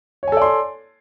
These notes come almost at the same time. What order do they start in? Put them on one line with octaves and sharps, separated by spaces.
C#5 G#5 A4 D5 C6